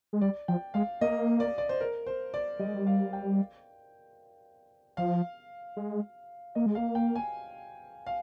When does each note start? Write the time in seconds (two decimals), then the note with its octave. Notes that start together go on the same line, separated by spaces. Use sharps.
0.13 G#3
0.21 G3 D5
0.48 F3 G5
0.74 G#3 F5
1.01 A#3 D#5
1.40 D5
1.58 D5
1.69 C5
1.81 A#4
2.07 C5
2.34 D5
2.59 G3 D#5
2.67 G#3
2.74 G3
2.87 F5
3.13 G5
4.97 F3 F5
5.77 G#3
6.55 A#3 D#5
6.66 G#3
6.75 A#3 F5
6.95 G5
7.16 G#5
8.07 F5